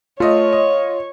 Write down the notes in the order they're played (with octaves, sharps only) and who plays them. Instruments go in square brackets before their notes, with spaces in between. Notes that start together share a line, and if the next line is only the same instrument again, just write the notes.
[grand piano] A3 D#5 [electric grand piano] F4 [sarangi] C#5
[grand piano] D#5